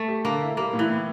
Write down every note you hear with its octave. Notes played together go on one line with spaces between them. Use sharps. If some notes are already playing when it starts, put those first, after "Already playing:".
Already playing: A3
G4
D3 A#3
E4
G3 A#3
A2
E3
A2